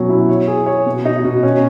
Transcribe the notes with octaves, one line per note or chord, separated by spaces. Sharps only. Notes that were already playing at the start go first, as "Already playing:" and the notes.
Already playing: B2 F#3 C#4
E4
C#5
G#4
C#5
B2
D#4
B2
C#4